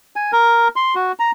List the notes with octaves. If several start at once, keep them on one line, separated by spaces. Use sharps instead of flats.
G#5
A#4
C6
F#4
A#5